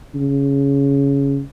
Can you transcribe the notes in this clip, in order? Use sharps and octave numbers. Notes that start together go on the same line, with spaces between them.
C#3